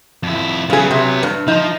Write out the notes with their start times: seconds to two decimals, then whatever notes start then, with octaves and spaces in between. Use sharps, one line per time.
0.23 F2 E4
0.70 C#3 F#3 B3 G#4
0.91 C3
1.23 G2
1.48 F3 D#4 F4